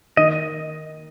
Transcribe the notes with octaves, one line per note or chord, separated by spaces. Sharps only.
D#3 D#5